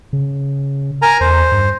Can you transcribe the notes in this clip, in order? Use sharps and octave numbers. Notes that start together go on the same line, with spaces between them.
C#3
A#4 G#5 A#5
E2 C5
G2